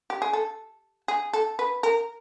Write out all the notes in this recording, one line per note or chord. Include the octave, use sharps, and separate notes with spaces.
G4
G#4
A4
G#4
A4
B4
A#4